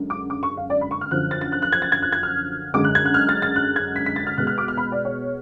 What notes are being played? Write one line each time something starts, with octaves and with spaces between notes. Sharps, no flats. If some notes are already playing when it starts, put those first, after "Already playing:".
Already playing: F#2 D3 G#3
D6
D6
C#6
F5
D5
B5
C#6
F6
F#2 D3 F3 F#6
A6
A6
F#6
F#6
G#6
A6
G#6
F#6
G#6
F6
F#2 D3 G#3 D6
F#6
G#6
F#6
F6
A6
A6
F#6
G#6
B6
B6
A6
F6
B2 G#3 F#6
F6
D6
F6
B5
D5
C#5